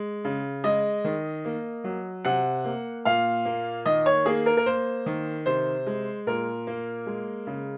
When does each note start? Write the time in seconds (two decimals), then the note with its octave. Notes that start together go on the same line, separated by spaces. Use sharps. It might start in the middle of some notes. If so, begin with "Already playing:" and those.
Already playing: G#3
0.25 C#3
0.64 G#3 D#5
1.04 D#3
1.45 A#3
1.84 F#3
2.25 C3 F#5
2.64 A#3
3.05 A#2 F5
3.45 A#3
3.86 D#3 D#5
4.06 C#5
4.26 A#3 G#4
4.46 A#4
4.57 A#4
4.66 A#3 C5
5.06 D#3
5.46 C3 C5
5.87 G#3
6.27 A#2 A#4
6.67 A#3
7.06 G#3
7.47 C#3